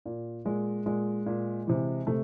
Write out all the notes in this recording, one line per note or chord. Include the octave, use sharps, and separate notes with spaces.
A#2
A#2 G#3
A#2 G#3
A#2
C3 E3
C3 A3